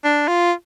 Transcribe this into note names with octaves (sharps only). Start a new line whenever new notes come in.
D4
F4